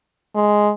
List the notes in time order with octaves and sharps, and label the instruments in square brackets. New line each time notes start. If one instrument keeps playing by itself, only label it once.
[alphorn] G#3